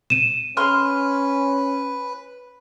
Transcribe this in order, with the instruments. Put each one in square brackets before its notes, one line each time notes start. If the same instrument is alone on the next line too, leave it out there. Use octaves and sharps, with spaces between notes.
[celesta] D#7 E7
[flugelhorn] C#4 [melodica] B4 [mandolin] C6 F6